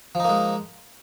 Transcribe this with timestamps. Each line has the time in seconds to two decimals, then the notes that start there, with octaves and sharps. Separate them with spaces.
0.15 F3
0.20 D#4
0.24 A#3
0.29 G#3